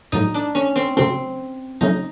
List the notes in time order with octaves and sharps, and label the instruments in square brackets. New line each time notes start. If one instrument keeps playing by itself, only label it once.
[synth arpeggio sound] A2 F#3 A3 [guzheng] D#4
[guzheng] D4
C#4
C4
[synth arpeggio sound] C#3 F#3 A3 C#4 [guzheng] C4
[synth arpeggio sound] C#3 F#3 A3 C#4 [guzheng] D#4